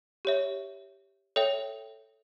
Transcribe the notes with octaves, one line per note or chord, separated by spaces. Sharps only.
G4 C#5 E5
A4 C#5 E5 G5